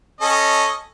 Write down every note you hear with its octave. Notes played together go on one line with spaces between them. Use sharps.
C#4 A4 D#5